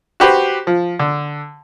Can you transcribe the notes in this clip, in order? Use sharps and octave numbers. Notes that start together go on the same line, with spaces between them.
F#4 G4 B4 C5
F3
D3